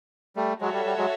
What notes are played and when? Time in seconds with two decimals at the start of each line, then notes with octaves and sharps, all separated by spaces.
0.36 G3 A3
0.60 F#3 G#3 F#4 A4 C#5 E5
0.73 G3
0.85 G3
0.98 F#3 G#3